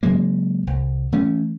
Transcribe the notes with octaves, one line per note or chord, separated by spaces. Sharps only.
C#3 F#3 G#3 A#3
C2
E3 A3 C#4